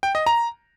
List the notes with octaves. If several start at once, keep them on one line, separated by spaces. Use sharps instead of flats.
G5
D#5
A#5